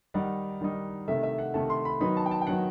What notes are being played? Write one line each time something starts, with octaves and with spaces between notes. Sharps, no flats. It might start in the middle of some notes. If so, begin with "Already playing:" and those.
D#3 G3 D#4 F#5
D#3 G3 D#4
C3 D#3 A3 E5
E5
F#5
C3 D#3 A3 A5
C6
B5
D#3 F#3 B3 D#4 B5
A5
G5
A5
G5
D#3 F#3 B3 D#4 F#5